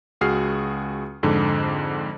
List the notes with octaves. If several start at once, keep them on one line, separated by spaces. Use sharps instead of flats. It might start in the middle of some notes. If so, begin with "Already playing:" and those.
C#2 F#4 G#4 F6 C7
F2 G#2 D3